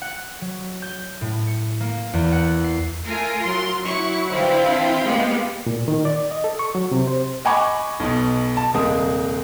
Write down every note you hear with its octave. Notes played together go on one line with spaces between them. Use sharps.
F#5
F#3
G6
A2
C#7
A#3
E2
F#5
C7
A3 F4 A#4 G#5
F#3 C6
F#3 E4 C#6
D3 E3 E4 F4 C5 F5 G5
C4 D4 E5
G#3 A#3 B3 G4
A#2
D#3
D5
D#5
A4
C#6
F#3
C3
C5
D#5 F#5 G#5 B5 C#6 D6
B1 B2
A5
D#1 C3 G#3 A#3 D#6